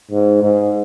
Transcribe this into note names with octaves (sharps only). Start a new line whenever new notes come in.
G#2
G#2